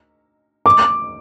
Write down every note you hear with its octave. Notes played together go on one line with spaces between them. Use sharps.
D6